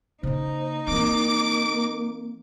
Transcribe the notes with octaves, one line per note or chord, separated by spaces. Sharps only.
C#3 A#3 D#4 C5
E3 A#3 C4 D6 D7